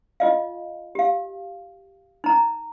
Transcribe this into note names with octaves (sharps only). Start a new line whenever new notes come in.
F4 D#5 F5
G4 F5
D#4 A#5